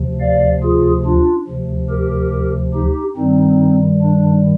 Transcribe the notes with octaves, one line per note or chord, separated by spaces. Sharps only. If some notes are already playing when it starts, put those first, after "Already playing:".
Already playing: D2 C3 F3
D5 F5
F4 G#4
D4 F4
D2 C3 F3
G4 A#4
D#4 G4
G2 D#3 G3 C4 D#4
D4